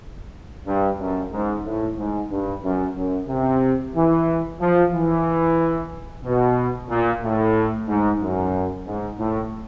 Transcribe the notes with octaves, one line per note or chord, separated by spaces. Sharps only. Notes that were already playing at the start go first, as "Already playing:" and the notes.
G2
F#2
G#2
A2
G#2
G2
F#2
F#2
C3
E3
F3
E3
B2
A#2
A2
G#2
F#2
G#2
A2